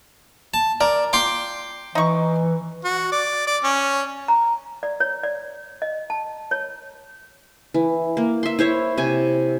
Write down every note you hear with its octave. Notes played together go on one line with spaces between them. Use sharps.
A5
A#4 D5
F4 G5 C6 D6
E3 D#4 C#6
F#4
D5
D5
C#4
A#5
D5
C#5
D5
D#5
A5
C#5
E3
A#3
E5 C6
E4 C5 C#5 E5
C3 G#5